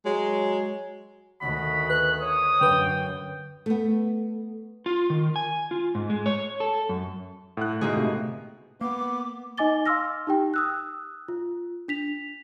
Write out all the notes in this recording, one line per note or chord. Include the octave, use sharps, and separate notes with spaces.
F#3 G#3
D2 D#3 F#4 B5
B4 F#6
C#5 D#6
F#2 D3 B4 G5
A3 B3
F4
D#3
G#5
F4
G#2
G#3
C#5
A4
F#2
A2 F#5 F#6
G#2 B2 D3 A#3 D#4 F4 G#4
C3 A3
A#3 B3 D6
D#4 D#5 G#5 D6 A6 G7
F5 C6 D6 E6 F6 A#6
D#4 G4 G5
D#6 E6 F#6
F4
D4 B6 F7